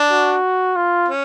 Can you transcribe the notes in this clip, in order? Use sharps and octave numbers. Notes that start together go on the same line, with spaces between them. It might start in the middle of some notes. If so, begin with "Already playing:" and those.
Already playing: D4
F#4
F4
C#4